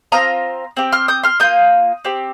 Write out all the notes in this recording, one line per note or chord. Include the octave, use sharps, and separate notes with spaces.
C4 F4 A#5 D#6
C4 G4
C6 F6
D#6 G6
C6 F6
A#3 F4 D#6 G6
C4 G4